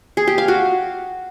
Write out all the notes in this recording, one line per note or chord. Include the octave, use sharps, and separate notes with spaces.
G#4
G4
F5
F#4